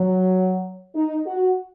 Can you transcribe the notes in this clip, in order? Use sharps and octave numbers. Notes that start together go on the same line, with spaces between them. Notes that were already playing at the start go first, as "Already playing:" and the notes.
Already playing: F#3
D#4
F#4